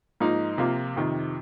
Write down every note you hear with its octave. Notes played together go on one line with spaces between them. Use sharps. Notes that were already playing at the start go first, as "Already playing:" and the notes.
G#2 F3 A#3 D#4
C3 F3 A#3 F4
F2 C3 D#3